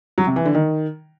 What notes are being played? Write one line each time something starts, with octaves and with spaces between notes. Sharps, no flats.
F#3
C3
E3
D3
D#3